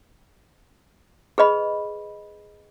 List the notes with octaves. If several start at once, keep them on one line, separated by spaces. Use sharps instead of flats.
G#4 B4 D#5 B5